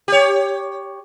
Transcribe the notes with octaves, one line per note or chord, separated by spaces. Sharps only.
G4 C#5